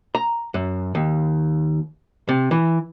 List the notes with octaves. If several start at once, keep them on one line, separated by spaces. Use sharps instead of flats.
A#5
F#2
D#2
C3
E3